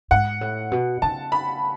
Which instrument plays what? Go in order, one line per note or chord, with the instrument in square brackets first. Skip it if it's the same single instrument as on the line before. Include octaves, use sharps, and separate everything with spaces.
[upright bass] G#2 [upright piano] F#5
[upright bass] A2
B2
[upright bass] C#3 [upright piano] A5
[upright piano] B5